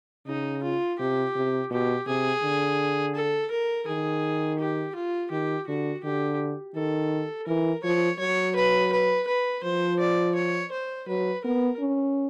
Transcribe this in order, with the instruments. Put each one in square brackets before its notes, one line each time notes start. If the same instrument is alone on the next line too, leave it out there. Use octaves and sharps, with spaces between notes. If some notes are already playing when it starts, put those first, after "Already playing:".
[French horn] C#3 [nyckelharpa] D#4
[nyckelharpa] F4
[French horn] C3 [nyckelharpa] G4
[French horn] C3
[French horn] B2 [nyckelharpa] G4
[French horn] C3 [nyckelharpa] G#4
[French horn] D3
[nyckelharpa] A4
A#4
[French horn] D#3 [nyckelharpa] G#4
[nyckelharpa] G4
F4
[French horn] D#3 [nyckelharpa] G4
[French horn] D3 [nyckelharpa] F#4
[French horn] D3 [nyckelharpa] G4
[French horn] D#3 [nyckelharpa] A4
[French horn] E3 [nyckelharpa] A#4
[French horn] F3 [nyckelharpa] C#5
[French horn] F#3 [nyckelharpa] C#5
[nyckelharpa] B4
B4
B4
[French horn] F3 [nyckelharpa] C5
[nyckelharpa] D5
C#5
C5
[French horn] F#3 [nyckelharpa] B4
[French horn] B3 [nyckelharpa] A#4
[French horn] C#4